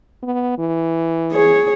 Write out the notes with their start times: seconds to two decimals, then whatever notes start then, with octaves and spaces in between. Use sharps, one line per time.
0.23 B3
0.58 E3
1.32 G#4 C#5